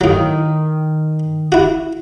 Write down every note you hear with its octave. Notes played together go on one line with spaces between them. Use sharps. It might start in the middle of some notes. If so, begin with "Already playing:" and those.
A2 D#3 F#3 D#5
E4 F#4